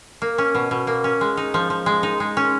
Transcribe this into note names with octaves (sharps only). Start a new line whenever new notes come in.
A#3
C#4
B2
B2
A#3
C#4
G#3
D#4
F3
F3
G#3
D#4
G#3
C#4